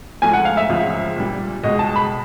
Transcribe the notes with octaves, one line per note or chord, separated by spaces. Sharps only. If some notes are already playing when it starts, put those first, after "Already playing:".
G#2 F3 A3 G#5
F#5
F5
E5
C#2 C#3 F3
A#2 G3
C#2 B2 G#3 D#5
A5
B5